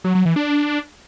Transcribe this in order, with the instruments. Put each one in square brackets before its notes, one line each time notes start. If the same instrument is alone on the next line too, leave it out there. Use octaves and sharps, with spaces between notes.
[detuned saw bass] F#3
F#3
E3
D4